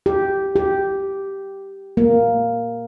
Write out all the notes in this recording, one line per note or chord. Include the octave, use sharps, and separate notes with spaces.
G4
G4
A#3